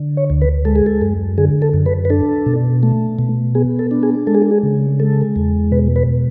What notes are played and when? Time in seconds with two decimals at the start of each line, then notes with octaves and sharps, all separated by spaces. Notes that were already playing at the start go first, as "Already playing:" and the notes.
Already playing: D3
0.17 C#5
0.30 D2
0.42 B4
0.65 G#3 A4
0.76 G#4
0.86 A4
1.01 F#2
1.38 D3 G#4
1.62 A4
1.74 F#2
1.86 B4
2.05 B4
2.10 D4 A4
2.46 B2
2.83 A3
3.19 B2
3.55 B3 G#4
3.79 A4
3.91 D4
4.03 G#4
4.27 G#3 A4
4.35 G#4
4.42 A4
4.51 G#4
4.63 C#3
5.00 G#3 A4
5.36 E2
5.72 B2 B4
5.96 B4